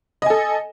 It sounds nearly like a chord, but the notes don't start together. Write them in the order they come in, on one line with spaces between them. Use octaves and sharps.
D#5 G#5 A4